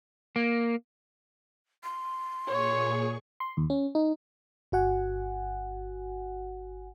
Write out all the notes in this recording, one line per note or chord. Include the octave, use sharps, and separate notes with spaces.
A#3
C6
A#2 G#4 C#5 C#6
C6
D#2
C#4
D#4
G1 F#4 F#5 G#5